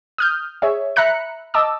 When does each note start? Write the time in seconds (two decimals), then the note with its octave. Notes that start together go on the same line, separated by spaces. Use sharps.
0.18 D#6 F6 G6
0.62 G#4 C#5 E5
0.96 E5 A#5 B5 F#6 C#7
1.54 D#5 A5 D6 E6